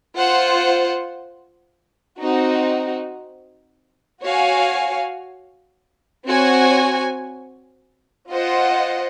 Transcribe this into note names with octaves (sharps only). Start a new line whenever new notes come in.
F4 C5 F#5
C4 D#4 F#4
F#4 C#5 F5 G#5
C4 F#4 C#5 G#5
F4 C5 D#5 F#5